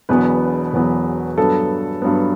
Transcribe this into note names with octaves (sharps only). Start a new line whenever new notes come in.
E1 E2 B2 F#3 B3 B4
E1 E2 B2 F#3 B3
G2 F#3 B3 A4
G2 F#3 B3